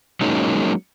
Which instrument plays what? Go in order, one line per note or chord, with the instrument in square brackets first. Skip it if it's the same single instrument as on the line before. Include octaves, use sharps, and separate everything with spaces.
[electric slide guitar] F#3 G#3 A#3 C#4 D#4